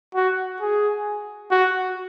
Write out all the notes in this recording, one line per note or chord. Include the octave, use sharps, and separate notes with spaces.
F#4
G#4
F#4